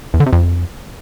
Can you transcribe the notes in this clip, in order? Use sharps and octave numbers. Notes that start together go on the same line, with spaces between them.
E2
D3
C3
F2